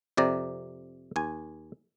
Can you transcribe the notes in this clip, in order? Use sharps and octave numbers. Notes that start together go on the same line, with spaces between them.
F2 C3 D5 A#5
D#2 G#5